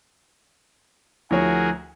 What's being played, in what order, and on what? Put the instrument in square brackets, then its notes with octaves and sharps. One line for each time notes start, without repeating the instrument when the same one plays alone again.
[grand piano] D2 C#5 [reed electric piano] F3 E4 [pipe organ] F#4 G#4 A#4